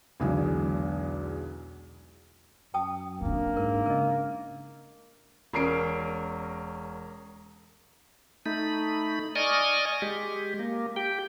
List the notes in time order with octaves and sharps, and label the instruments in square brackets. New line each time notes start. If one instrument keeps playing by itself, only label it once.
[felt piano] B1 E2 D3 F#3 G#3
[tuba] F#2 [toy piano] G5 A5 D#6
[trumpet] A#3 [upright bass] C4 D4
[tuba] G#2 [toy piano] A#4
[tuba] C#3 [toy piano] A#4 D#5
[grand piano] E1 C#4 A#4 C7 D7
[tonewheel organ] A3 D#4 B5
D5 D#5 G#5 C#6 D#6 F6
G#3 G4
A#3
G4 G5